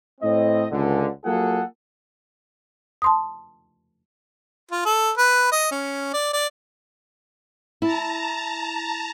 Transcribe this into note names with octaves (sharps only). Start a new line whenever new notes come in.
A2 C4 D#5
C#2 D3
F#3 A#3 F4 G#4 A4 F#5
A5 C6 D#6
F4
A4
B4
D#5
C#4
D5
D5
E4 A5 A#5